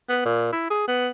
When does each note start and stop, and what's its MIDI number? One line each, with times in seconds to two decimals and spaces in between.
0.09 0.25 59
0.25 0.50 46
0.53 0.70 64
0.70 0.86 68
0.88 1.09 59